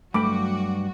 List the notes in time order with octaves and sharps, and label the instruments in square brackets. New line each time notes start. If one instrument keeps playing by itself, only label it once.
[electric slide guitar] G2 G5 [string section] F#3 F#4 [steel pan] A3 B5 [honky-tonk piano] D6